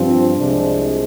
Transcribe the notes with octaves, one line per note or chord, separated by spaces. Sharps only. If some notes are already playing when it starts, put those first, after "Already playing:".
Already playing: G2 F3 C4
C2 C3 F3 G#3 C4 D4